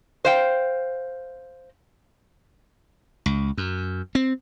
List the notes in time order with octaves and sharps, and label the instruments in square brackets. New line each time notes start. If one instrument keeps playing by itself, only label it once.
[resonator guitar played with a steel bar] C5 F5 G5
[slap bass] C#2
F#2
C4